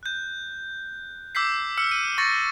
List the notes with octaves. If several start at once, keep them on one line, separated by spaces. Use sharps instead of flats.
F#6 G6
D6 E6 G6 B6 C7
E6 F6 C#7
D#7
C#6 A6 A#6 C#7